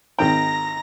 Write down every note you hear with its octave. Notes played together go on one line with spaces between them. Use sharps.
G#1 D#3 G5 A#5 A#6